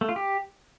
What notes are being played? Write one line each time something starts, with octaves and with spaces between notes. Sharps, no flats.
A3
F4
G4